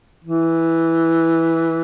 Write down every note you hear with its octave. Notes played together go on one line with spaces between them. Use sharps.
E3